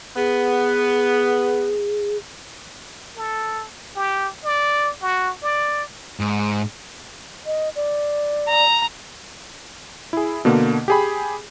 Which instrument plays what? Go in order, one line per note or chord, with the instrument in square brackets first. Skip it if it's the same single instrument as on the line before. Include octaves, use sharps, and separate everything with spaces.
[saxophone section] B3 [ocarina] G#4
[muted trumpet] A4
G4
D5
F#4
D5
[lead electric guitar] G#2
[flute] D#5
D5
[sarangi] A#5
[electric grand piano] E4 G#4
B2 D3 A#3
G4 G#4 B5